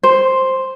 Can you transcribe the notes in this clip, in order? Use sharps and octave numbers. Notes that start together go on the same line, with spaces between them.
C5